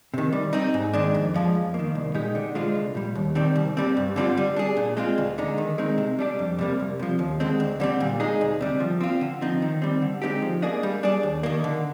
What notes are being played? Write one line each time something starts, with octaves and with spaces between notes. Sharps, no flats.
C3 D#3
G3
C4 D#4
G#2
D#3 G#3 D4
F2
D3 F3 G#3
F2
D#3 A#3
C2
A#2 G#3 D#4 G4
D3
G#3 D4 F4 C5
C2
A#2 G3
D#2
D#3 G3 C4
C2
C3 G3 C4
G2
D3 G3 C4 F4
G3
D4 G#4
A#2
G#3 C4 F4
D2
D3 G#3 D#4
D#3
G#3 C4 D#4
C3
G3 D4 G4 D5
F2
C3 G3 A#3
C2
C3 F3
D#2
D3 G#3 C4
D2
D3 G3 C4
A#2
G#3 D#4 G#4
D2
C3 G3
F3
C4 F4
D3
F3 C4 D#4
D#3
G3 C4
D3
G#3 C4 D#4 G4
F3
A#3 D4 G#4 D#5
G3
D4 G#4 D5
D#2
D#3 A#3
D3